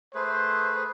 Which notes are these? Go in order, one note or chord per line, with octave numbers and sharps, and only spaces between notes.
A3 G#4 B4 C5